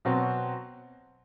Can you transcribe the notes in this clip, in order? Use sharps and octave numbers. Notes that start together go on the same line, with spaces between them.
B2 F#3 C4